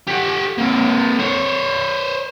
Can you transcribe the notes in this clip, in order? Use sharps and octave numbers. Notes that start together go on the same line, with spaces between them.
G4 F#5
A#3 C4
C5 C#5